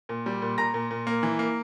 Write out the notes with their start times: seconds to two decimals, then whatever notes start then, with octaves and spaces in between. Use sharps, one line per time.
0.09 A#2
0.26 G3
0.42 A#2
0.58 A#2 A#5 A#6
0.74 A#2
0.90 A#2
1.07 A#3
1.23 E3
1.39 A#3